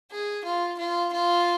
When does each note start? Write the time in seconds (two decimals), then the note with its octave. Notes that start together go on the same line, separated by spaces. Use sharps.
0.11 G#4
0.45 F4
0.78 F4
1.12 F4